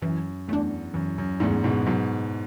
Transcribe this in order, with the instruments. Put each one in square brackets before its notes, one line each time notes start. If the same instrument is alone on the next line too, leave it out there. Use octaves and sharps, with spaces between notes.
[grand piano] F#2 [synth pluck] E3
[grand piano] E2 [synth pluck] A3 D4
[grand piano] F#2 [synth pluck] E3
[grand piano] F#2
[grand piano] E2 G#2 [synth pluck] A3 D4
[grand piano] G#2 B2
[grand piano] G#2 B2 [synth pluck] F#3